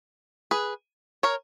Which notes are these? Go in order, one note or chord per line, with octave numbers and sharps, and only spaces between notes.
G#4 B4
A#4 C#5